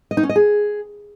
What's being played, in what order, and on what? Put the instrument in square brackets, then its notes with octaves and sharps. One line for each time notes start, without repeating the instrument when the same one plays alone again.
[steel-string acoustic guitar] D#5
D#4
C#4
D#5
G#4